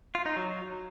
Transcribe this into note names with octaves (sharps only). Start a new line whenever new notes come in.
F4
D#4
F#3